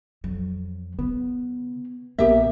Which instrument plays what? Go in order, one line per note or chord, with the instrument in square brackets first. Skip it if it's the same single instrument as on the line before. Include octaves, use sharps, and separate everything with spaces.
[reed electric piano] F2 [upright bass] F#3
[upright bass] C#3 [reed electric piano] B3
[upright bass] A#1 C#3 [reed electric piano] A#3 B3 A#4 [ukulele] G4 E5